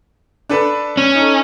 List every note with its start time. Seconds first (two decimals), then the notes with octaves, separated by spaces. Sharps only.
0.49 D4 A4 B4
0.97 C#4
1.15 D#4 A4